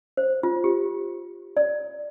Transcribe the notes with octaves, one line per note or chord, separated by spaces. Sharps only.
C5
F4
G4
D5